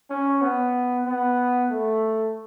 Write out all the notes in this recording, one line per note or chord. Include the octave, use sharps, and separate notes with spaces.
C#4
B3
B3
A3